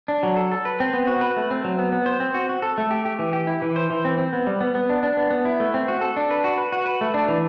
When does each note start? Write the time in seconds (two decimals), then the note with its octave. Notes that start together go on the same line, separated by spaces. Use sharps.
0.08 D4
0.23 F#3
0.37 A4
0.52 A4
0.65 B4
0.80 C4
0.94 B3
1.07 F#4
1.21 B4
1.37 A3
1.51 C4
1.64 F#3
1.79 B3
1.92 B3
2.06 C5
2.20 C4
2.34 F#4
2.49 F#4
2.62 A4
2.78 A3
2.91 G4
3.05 G4
3.19 E3
3.33 G4
3.47 E4
3.62 E3
3.76 C5
3.90 E3
4.05 C4
4.18 C4
4.33 B3
4.47 G3
4.61 B3
4.75 B3
4.89 D4
5.03 D4
5.17 B3
5.31 B3
5.45 E4
5.60 A3
5.74 C4
5.88 F#4
6.01 A4
6.16 D4
6.31 B4
6.44 F#4
6.58 B4
6.72 F#4
6.86 B4
7.01 A3
7.14 D4
7.28 E3